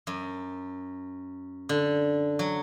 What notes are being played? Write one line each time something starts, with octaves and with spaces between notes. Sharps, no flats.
F#2
D3
F#3